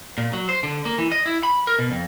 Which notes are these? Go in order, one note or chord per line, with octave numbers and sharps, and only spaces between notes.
A#2
F#3
C5
D3
A#3
E3
D#5
E4
B5
A#4
B2
F2